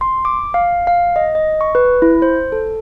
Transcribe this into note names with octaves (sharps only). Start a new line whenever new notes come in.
C6
D6
F5
F5
D#5
D#5
C#6
B4
E4
C5
A4